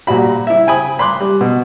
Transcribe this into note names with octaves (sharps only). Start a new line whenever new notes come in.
A#2 G3 F#4 B5
E4 E5
G5 G#5 B5 D#6
B5 C6 D6 F#6
G3
B2